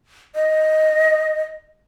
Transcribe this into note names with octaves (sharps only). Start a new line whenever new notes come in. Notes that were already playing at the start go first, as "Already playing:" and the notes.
D#5